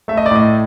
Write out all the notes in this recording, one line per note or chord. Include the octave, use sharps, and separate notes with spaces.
A3 E5
D#5
D5
A2 D#5